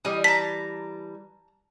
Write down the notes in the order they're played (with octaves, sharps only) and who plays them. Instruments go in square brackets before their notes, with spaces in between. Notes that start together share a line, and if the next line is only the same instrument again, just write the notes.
[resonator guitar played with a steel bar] E3 G3 [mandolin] D#5
[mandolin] A5 A#5 [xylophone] B6